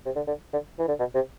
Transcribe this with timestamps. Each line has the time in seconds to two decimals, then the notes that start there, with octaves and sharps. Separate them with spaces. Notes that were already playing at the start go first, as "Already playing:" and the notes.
0.06 C3
0.16 D3
0.27 D3
0.53 D3
0.79 E3
0.88 D3
0.99 B2
1.15 C3